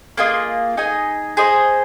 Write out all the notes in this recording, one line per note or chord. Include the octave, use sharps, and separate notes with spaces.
A#3 F4 G#4 D#5
D#4 G#4 D#5 G#5
G#4 C5 D#5